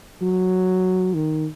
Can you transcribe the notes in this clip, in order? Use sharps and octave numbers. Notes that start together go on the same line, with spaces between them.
F#3
D#3